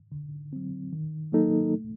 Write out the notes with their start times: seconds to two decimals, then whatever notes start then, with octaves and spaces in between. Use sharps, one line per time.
0.12 D3
0.53 F#3 C4
0.93 D#3
1.32 F#3 A#3 D#4 A4
1.74 A3